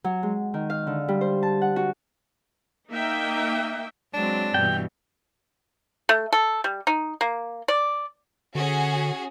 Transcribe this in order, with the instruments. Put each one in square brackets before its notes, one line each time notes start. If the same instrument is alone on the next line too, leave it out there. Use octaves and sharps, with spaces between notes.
[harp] F#3
G#3
D#3
F5
D3
G3
C5
A5
F#5
F#4
[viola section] A#3 D#4 E5 G5
[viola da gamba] F#3 G#3 C4 [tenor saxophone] D4
[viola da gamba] G2 B2 E3 [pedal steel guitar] G5
[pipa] A3
A4
G3
D#4
A#3
D5
[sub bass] D3 [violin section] C#4 F#4 G#4